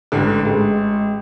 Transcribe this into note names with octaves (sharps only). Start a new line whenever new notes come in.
A1 G#2 D3
A1 G#3